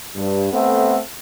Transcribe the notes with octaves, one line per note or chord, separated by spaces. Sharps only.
G2
A3 B3 C4 A4 E5 F#5